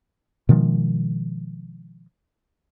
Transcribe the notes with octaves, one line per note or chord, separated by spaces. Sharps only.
B2 D#3 F3 G#3